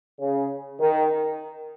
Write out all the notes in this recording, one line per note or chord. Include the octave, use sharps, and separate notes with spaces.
C#3
D#3